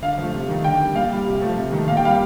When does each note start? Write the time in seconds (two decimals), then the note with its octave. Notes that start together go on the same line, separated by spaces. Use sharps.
0.02 D3 F5
0.18 F3 A3
0.34 C3
0.49 D#3 A3
0.64 D3 G5
0.79 G3
0.95 A#2 F5
1.10 G3
1.26 C3
1.41 F3 A3
1.57 C3
1.72 D#3 A3
1.88 A#2 F5
1.97 G5
2.04 G3 F5